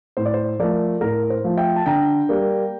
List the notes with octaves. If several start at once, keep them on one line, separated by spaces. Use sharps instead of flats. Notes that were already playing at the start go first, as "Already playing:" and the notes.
A2 C5
D5
C5
F3 A3 A#4 D5
A2 A#4
C5
F3 A3
E5 G5
A5
D3 G5 A#5
G3 A#3